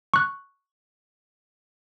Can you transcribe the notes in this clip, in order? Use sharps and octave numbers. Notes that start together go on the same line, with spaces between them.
C#6 F#6